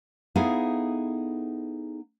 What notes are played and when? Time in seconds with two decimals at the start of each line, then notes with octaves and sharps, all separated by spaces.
0.36 B3 D#4 E4 G#4 A4 F5